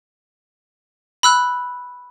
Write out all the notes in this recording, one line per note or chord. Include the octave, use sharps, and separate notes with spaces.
B5 E6 F#6